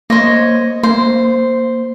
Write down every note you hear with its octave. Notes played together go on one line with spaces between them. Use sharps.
A#3 C5 C#5 D#5
A#3 C5